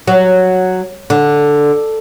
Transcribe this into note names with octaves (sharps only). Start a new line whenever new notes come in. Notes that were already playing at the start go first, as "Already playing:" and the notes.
F#3
D3